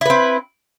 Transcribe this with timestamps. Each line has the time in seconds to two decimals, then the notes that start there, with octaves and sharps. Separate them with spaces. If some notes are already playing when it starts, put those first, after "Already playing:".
0.01 E4
0.06 B4
0.10 C4